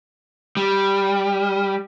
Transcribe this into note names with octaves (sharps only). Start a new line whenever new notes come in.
G3